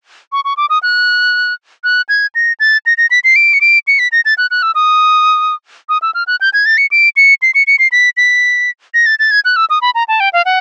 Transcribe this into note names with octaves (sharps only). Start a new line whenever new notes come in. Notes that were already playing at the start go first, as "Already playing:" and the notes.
C#6
C#6
D6
D#6
F#6
F#6
G#6
A#6
A6
A#6
A#6
B6
C7
D7
C#7
D7
C#7
B6
A#6
A6
F#6
F#6
E6
D#6
D#6
E6
F6
F#6
G6
G#6
A6
C#7
D7
C#7
C7
C#7
C#7
C7
B6
B6
A#6
A6
A6
G#6
F#6
E6
D#6
B5
A#5
A5
G5
F5
F#5